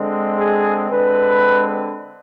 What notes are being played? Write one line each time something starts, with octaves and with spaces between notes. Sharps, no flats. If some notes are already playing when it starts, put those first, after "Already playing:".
Already playing: D3 G#3 C4
G#4
D3 G#3 C4 B4